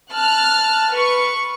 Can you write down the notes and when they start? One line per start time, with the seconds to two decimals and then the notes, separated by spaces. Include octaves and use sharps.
0.12 A5 F6 F#6
0.92 B4 C#6